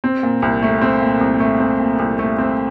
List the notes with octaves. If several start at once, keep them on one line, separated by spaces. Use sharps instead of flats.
C4
A#2
C2
A3
C4
A#2
C2
A3
C4
A#2
C2
A3
C4